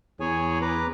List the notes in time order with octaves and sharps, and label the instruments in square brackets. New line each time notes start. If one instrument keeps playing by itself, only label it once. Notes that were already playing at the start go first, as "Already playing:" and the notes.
[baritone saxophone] E2 [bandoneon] G#4 C#5 G#5
[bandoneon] B4 A#5 D6